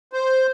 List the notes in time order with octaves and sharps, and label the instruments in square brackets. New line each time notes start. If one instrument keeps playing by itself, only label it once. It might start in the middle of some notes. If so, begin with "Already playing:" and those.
[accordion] C5